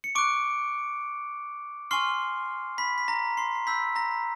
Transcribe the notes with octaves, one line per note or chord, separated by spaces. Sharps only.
C#7
C#6 D6 F#6 D7
G#5 C6 C#6 F6 C7
B5 B6
B6
A#5 A#6
C6 C7
C7
B5 E6 G6 B6
A#5 A#6